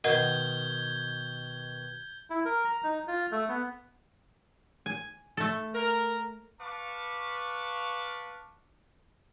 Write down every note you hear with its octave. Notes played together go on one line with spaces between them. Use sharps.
B2 D#3 A#4 D#5 F#5 G6 G#6 G7
E4
A#4
A#5
D#4
F4
A3
B3
G#5
A3 A4
A#4
B4 F5 A5 C#6 D6